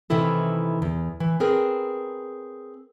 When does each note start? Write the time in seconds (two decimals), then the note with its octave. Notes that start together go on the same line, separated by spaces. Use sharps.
0.10 C3 D#3 E3 E4 A4
0.82 E2
1.20 E3
1.40 C4 G#4 A#4 B4